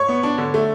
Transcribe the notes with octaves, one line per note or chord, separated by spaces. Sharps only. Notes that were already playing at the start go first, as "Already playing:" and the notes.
Already playing: C#5 C#6
B3
D4
D3
A3